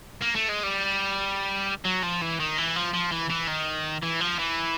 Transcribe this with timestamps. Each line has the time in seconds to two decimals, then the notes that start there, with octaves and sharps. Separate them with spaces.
0.22 A#3
0.36 A3
0.49 G#3
0.63 G3
1.85 F#3
2.03 F3
2.22 E3
2.40 D#3
2.58 E3
2.76 F3
2.94 F3
3.12 E3
3.30 E3
3.48 D#3
4.02 E3
4.20 F3
4.39 E3